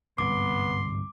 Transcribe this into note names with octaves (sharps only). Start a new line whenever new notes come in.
G1 C2 G#2 B3 C6 D6